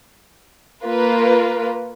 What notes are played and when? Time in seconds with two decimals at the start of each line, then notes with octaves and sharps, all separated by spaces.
0.82 A#3 F4 B4